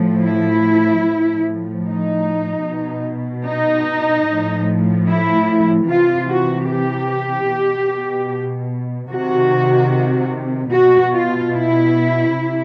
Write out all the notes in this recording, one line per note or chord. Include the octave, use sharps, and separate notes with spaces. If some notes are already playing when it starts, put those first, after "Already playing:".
Already playing: A2 F3
E4
A2 F3
D#4
B2
D#4
A2 F3
E4
C3 E3 F4
F#4
G4
B2
C3 D#3 F#4
B2 F#4
F4
E4
C3